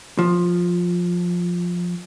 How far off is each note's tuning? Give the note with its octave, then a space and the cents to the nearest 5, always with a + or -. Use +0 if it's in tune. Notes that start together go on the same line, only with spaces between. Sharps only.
F3 +10